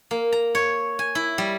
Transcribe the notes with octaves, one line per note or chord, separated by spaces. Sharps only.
A#3
A#5
C#5
G#5
E4
G3